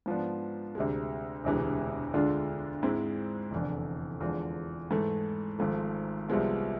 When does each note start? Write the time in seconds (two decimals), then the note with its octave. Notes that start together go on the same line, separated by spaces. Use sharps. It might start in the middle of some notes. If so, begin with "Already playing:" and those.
0.06 G#2 F3 B3 D4
0.75 D2 C3 G#3
1.44 E1 D2 C3 E3 G#3
2.13 D2 D3 G#3 D4 F4
2.83 G#2 G#3 C4 E4
3.51 F1 E2 D3
4.21 E2 D3 F3 G#3
4.91 G#2 E3 A3
5.59 G#1 G#2 F3 A3
6.28 C2 C3 F3 G#3 B3